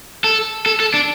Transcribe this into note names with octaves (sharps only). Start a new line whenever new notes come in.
A4
A4
A4
D4